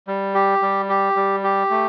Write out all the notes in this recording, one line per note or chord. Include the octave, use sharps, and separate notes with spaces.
G3
G4
G3
G4
G3
G4
A3